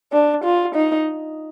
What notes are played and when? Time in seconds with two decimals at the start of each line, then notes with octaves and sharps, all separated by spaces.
0.12 D4
0.44 F4
0.75 D#4